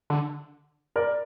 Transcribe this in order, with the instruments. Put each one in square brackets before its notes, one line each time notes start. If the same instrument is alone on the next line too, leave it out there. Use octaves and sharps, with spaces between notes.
[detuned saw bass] D3
[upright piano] A#4 D5